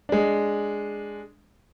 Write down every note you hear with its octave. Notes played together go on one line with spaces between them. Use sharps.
G#3 D4